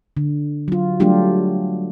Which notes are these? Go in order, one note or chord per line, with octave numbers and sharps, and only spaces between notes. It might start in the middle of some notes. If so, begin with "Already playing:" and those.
D3
F#3 F4
F#3 G3 A3 D4 F4 G4